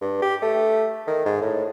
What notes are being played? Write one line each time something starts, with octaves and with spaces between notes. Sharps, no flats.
G2
G4
A3
D#3
G#2
A2